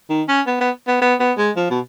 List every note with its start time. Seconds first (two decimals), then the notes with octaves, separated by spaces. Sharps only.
0.09 D#3
0.28 C#4
0.47 B3
0.61 B3
0.87 B3
1.02 B3
1.20 B3
1.38 G#3
1.57 F3
1.70 B2